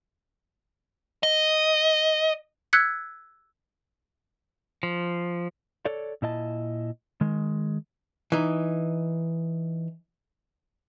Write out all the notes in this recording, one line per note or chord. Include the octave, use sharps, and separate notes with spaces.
D#5
E6 F#6 G#6 B6 C#7
F3
A4 C#5 D5
A#2 E4 D#5 A5
D#3 G#3
E3 D#4